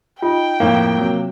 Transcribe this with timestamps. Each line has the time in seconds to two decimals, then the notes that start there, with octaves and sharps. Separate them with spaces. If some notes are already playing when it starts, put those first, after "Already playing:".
0.22 D#4 F4 G5
0.60 F2 A2 F3 A#3 F5
0.98 C3 F#3